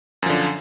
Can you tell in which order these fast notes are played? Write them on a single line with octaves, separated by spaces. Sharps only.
F#2 F3 D3